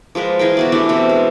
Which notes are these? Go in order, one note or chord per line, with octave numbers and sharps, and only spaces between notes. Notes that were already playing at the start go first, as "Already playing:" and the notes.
F3 G#3 A#4 B4
E3 G#4 A#4 G5
B2 F#4 D5
E3 A3 D4 G4
B2 C4 G5
G#3